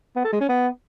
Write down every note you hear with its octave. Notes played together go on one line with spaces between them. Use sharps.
B3
A4
G#3
C#4
B3